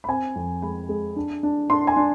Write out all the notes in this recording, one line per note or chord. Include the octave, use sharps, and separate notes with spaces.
B5
C4 G#5
F2
G#3 B5
G#3
D4
D4
D4 C6
G#5
D4